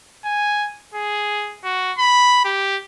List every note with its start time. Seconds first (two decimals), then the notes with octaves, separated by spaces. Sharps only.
0.24 G#5
0.94 G#4
1.64 F#4
1.98 B5
2.45 G4